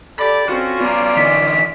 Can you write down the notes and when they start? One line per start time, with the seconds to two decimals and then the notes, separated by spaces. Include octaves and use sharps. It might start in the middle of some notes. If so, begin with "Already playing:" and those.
0.19 G4 A4 D5 B5
0.49 C4 C#4 F4 F#4
0.81 B3 D5 A#5
1.17 E3 D#4 B6